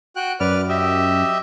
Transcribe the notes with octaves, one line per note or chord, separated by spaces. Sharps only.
F#4 G5 F#6
F#2 B4 D5 F6
G4 D#5 E5